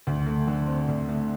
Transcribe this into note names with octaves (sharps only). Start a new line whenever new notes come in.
D2
A3
D3
C4
D2
A3